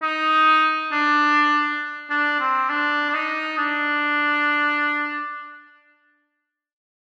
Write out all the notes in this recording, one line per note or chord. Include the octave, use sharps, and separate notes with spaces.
D#4
D4
D4
C4
D4
D4
D#4
D4